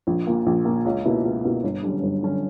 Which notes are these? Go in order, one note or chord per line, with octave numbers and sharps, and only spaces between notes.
A#1
A#2 A#3
A#1
A#2 A#3
C#2
B2 A#3 E4
C#2
B2 A#3 E4
G1
F#2 D3 G3 C#4
G1
F#2 D3 G3 C#4